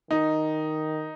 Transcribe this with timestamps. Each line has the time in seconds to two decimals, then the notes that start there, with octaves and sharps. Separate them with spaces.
0.11 D#3 D#4